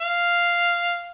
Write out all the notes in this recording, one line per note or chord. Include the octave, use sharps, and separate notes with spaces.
F5